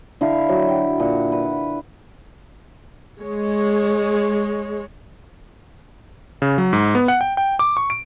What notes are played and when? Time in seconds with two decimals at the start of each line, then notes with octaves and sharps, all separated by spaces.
0.21 D3 E4 F5
0.49 F#3
0.68 G5
1.00 A#2 F#5
1.32 B4
3.20 G#3 C#5
6.42 C#3
6.58 F#3
6.73 G#2
6.95 B3
7.08 F#5
7.21 G5
7.37 G5
7.59 D6
7.77 C#6
7.90 D7